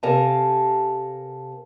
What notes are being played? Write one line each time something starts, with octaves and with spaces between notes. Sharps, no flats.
C3 A4 A#4 F5 G#5 A5